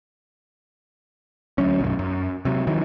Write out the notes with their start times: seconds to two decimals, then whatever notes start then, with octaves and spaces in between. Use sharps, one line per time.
1.58 D2 F#3 C#4
1.80 B1 F#2
1.99 F#2
2.45 C3 F#3
2.67 D#3 E3 F#3